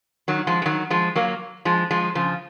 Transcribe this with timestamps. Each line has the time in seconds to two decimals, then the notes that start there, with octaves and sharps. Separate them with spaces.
0.28 D#3 F#3
0.47 F3 G#3
0.62 G#3
0.66 D#3 F#3
0.91 F3 G#3
1.16 F#3 A#3
1.65 F3 G#3
1.91 F3 G#3
2.15 C#3 F3